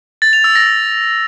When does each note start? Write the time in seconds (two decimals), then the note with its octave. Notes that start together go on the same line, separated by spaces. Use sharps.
0.22 A6
0.33 F7
0.44 E6
0.55 A#6